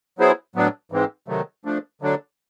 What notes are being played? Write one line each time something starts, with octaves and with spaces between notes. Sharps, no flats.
F#3 B3 E4 G#4 C5
A2 F#3 B3 D4
G#2 E3 G#3 C4
C3 D#3 F#3 A3
F3 A3 D4
D3 F#3 A3 D4